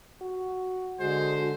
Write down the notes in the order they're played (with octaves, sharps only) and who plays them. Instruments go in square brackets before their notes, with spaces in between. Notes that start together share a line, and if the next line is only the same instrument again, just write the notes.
[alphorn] F#4
[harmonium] D3 [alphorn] G#3 [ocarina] F#4 [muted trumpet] C5